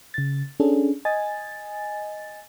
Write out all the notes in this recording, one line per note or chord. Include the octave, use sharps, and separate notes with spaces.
C#3 A6
C#4 D4 G#4 A4
D#5 G#5 A6